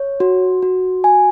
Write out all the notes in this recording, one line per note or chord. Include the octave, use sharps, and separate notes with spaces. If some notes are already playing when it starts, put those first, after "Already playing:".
Already playing: C#5
F#4
F#4
G#5